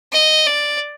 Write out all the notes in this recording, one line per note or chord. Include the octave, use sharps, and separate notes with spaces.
D#5
D5